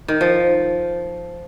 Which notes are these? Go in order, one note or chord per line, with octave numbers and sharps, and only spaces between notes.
D#3
F3